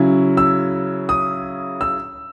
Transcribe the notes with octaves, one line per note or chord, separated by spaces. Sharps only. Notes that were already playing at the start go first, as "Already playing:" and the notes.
Already playing: C#3 F#3 C#4 E4
E6
D#6
E6